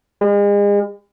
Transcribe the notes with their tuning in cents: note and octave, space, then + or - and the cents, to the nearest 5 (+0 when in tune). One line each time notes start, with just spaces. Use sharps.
G#3 -40